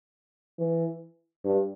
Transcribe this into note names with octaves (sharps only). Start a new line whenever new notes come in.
E3
G2